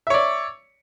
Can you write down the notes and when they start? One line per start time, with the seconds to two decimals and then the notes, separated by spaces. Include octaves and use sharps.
0.07 E5
0.10 C#5
0.14 D5